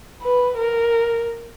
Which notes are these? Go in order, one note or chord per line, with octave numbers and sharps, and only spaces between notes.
B4
A#4